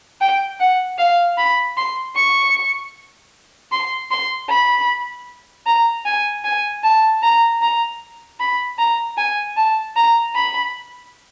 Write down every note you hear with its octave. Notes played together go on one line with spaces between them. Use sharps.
G5
F#5
F5
B5
C6
C#6
C6
C6
B5
A#5
G#5
G#5
A5
A#5
A#5
B5
A#5
G#5
A5
A#5
B5